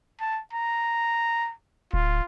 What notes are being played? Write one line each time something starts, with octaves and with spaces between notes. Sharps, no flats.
A5
A#5
D1 F4